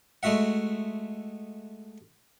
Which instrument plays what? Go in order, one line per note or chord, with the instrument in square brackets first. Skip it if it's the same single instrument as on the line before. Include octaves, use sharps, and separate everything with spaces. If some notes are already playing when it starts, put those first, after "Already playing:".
[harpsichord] G#3 A3 F#4 E5 F#5